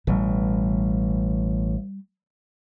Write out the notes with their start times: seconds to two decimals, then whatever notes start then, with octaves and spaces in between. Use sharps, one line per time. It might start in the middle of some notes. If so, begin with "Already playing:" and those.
0.07 A1 B2 G3